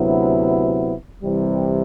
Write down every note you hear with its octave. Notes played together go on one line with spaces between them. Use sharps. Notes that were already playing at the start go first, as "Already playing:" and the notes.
Already playing: D2 C3 F#3 B3 E4
C2 C3 E3 G3